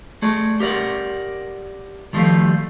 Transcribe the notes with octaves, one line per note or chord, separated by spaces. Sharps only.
A3 G#4 D5
G4 A#4 D5 F#5
D#3 F3 G3 A3 F4